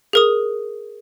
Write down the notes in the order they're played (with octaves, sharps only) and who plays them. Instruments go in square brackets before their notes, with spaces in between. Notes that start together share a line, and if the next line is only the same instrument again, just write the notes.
[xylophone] G#4 A#4 D#6